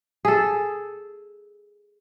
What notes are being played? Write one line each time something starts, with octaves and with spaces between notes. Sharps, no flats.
G#4 A4